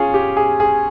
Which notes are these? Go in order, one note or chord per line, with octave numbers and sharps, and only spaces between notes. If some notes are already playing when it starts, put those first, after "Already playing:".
Already playing: C#4 F4 G#4
G4
G#4
G#4